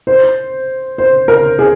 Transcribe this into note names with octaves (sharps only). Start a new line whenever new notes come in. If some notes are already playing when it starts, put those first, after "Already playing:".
C5
C5
A#4
G#4